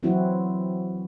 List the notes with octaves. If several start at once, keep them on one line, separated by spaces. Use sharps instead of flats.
E3 F#3 C4 E4 F#4